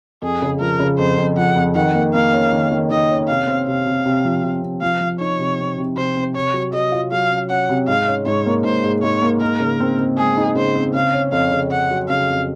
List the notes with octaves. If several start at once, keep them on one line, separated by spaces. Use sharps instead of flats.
F2 G#4
C#3
F3 A#4
C#3
F2 C5
F2
F3 F#5
F2
D#3 F#5
A#3
A#3 F5
C#4
D#3
D#3
D#3 D#5
C#4
C3 F5
C4
C3 F5
C3
C3
F3
C3
C3
F3 F5
F3
D#4 C#5
C3
C4
C3
C3 C5
C4
C3 C#5
F#3
F#3 D#5
F4
F#3 F5
C#4
C#4 F#5
C3
G#2 F5
C#4
G#2 C#5
A#3
G#2 C5
G#2
G#2 C#5
A#3
D#4 A#4
C#3
C4
C4
G#3 G#4
D#4
C#3 C5
C4
C#3 F5
C#4
F2 F5
C#3
C#4 F#5
F#3
C#3 F5
F2